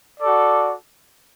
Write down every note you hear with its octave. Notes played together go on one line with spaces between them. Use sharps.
F#4 A4 D5